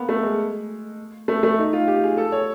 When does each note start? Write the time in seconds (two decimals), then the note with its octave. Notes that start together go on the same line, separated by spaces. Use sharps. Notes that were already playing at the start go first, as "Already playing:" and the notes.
Already playing: A#3 B3
0.09 A3
0.23 G#3
1.28 A3
1.43 A3
1.58 D#4
1.73 F4
1.88 G4
2.03 G#4
2.17 A4
2.32 C#5